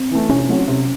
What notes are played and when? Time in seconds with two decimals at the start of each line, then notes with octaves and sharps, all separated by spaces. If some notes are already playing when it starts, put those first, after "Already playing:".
Already playing: C4
0.11 E3 A3
0.29 C3 C#4
0.49 F#3 A3 C4 F#4
0.67 C3